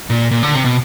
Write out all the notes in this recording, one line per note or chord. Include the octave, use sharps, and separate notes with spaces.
A#2
A#2
D3
C3
B2